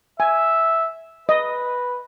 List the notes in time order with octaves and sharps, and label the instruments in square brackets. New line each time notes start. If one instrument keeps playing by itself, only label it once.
[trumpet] E5 [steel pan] G#5
[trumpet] B4 [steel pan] D#5